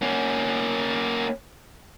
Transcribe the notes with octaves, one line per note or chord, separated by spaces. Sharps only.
A#3 C#4